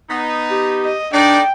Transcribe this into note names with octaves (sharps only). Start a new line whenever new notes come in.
B3 D#4
G4
D#5
D4 D#4 A4 D5 G5